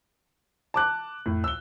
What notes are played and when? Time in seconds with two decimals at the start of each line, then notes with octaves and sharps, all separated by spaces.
0.74 A5 D6 F#6
1.26 F2 A2
1.44 D2 E6 G7